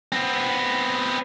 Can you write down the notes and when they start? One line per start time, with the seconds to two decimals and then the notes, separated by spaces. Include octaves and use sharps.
0.12 B3 C4